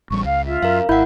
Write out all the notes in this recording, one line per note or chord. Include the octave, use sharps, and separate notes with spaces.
A1 G3 C#6
C#2 F5
F4 E5
F#2 A#4 F5
G#1 E4 E5 F#5 G6